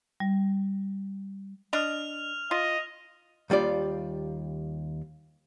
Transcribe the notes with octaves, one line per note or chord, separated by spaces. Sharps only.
G3
D4 D#5 F6 F7
F4 D#5
D#2 G3 F4 D5